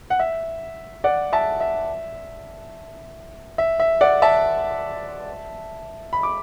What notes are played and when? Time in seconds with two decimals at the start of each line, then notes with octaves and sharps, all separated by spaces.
0.10 F#5
0.20 E5
1.04 D5 F#5
1.33 E5 A5
1.60 E5
3.58 E5
3.80 E5
4.01 D5 F#5
4.22 E5 A5
6.13 B5
6.23 D6